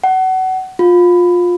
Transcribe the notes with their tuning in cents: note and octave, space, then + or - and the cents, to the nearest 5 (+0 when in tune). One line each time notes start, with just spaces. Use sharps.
F#5 +25
F4 +20